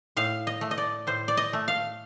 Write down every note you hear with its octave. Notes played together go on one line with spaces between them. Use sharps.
A2 F5
D#5
A3
D#5
D5
A2 C5
D5
D#5
A3
F5